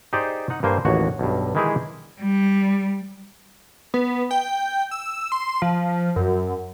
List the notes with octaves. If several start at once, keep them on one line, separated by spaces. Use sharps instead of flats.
D#4 G4 G#4 C5 D5
D#4 F#5
G2 A#3 C5 G#5
A1 D#2 F#4 C#5
B1 G2
D#3 E3 G#3 E4 G4 G#4
G3
B3
G5
E6
C6
F3
F#2